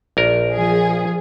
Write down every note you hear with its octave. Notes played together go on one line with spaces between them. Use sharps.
A#1 A#4
F3 G#4